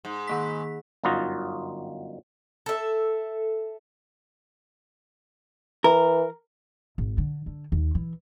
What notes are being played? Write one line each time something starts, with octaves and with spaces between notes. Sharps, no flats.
G#2
D#3 A#3 B6
G1 F#2 D#4 F4 F#4 D#5
A4 E5
E3 A#4
G#1
D3
D3
D#2
E3